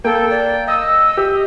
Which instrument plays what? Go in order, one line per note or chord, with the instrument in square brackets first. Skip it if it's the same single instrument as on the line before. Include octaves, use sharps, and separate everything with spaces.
[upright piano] A#3 [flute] A4 [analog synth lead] G5
[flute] D5
[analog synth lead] D#5 [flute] E6
[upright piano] G4